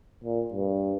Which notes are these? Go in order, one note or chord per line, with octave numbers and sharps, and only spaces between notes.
A#2
G2